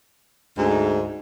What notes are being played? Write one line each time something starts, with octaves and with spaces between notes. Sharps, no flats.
D2 G#2